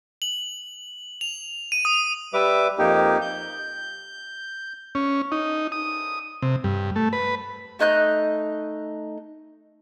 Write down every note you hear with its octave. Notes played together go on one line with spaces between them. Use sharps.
F#7
F7
D#7
D#6
G3 B4 E5 D6
F2 A#3 D#4 G4
G6
C#4
D#4
D#6
C3
G2
A3
B4
A3 D#4 F#6 G6